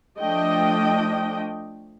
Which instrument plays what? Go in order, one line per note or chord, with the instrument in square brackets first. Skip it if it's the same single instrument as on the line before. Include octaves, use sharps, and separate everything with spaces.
[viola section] F3 A3 D4 D#5 G5